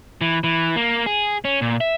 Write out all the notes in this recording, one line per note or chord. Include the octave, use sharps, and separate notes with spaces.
E3
E3
A#3
G#4
C#4
A#2
E5